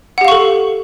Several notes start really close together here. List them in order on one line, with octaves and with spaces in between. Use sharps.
F#5 G4 F5 C#6 A4